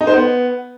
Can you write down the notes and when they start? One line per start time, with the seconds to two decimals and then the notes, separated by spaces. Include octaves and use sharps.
0.01 D#4
0.07 C5
0.14 B3